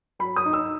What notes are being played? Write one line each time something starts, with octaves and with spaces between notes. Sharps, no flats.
F#3 B5
D#6
D#4
E6